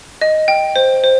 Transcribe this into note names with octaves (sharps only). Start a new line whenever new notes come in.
D#5
G5
C5
C5